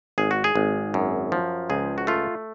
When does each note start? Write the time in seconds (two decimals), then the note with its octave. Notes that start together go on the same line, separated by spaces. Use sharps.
0.18 G#1 G#4
0.31 F#4
0.44 G#4
0.56 G#1
0.94 F#2
1.32 F3
1.70 C#2 G#4
1.98 F#4
2.07 A3 F4